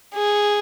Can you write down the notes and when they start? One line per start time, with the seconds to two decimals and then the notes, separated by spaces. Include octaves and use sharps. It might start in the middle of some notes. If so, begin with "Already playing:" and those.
0.14 G#4